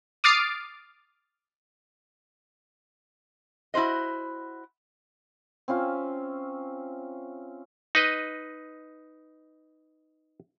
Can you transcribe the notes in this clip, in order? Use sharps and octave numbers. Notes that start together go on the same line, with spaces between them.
D6 D#6 F6 A6 C7 D7
E4 F#4 C5 D#5
C4 C#4 F4 E5
D#4 B4 D#5